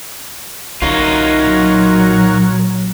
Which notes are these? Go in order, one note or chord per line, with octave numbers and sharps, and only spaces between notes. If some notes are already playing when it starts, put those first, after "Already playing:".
B1 D3 D#4 F4 F#4 A#4 C#5
A#2 F#3